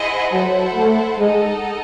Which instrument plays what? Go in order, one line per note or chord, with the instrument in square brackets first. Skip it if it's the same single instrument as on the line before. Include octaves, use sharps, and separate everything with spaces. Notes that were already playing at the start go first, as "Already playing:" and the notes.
Already playing: [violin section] E4 G#4 C5 D#5 F#5
[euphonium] F#3 [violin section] E4 A4 C5 F#5
[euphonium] A3
[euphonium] G#3 [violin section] D#4 A4 D#5 F#5